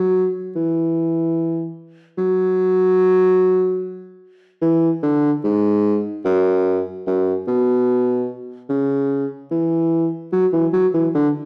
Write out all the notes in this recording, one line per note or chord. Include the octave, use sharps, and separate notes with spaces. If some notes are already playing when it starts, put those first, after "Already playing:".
Already playing: F#3
E3
F#3
E3
D3
G#2
F#2
F#2
B2
C#3
E3
F#3
E3
F#3
E3
D3